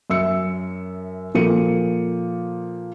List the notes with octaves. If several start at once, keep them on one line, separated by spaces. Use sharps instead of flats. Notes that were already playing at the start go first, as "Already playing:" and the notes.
F#2 E5 E6 C#7
A#2 F3 A#3 A4 C#7 D#7